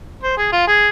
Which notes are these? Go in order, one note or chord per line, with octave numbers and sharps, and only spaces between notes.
C5
G#4
F4
G#4